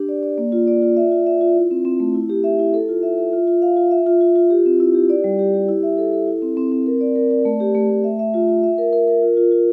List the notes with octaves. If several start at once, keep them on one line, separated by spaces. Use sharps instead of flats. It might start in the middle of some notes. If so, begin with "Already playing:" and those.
Already playing: D4 G4
D5
D5
A#3
F4
D5
F4
E5
F4
E5
F4
E4
C4
C4
A3
E4
G4
E5
E4
A4
F4
E5
E5
F4
F4
F5
F4
E5
F4
F4
F4
G4
C4
E4
G4
D5
G3
G4
G4
E4
E5
A4
A4
E4
C4
C4
C4
A#4
D5
A#4
D5
A3
G4
A3
A3
E5
E5
F4
F4
E5
A#4
A#4
A#4
F4
F4
F4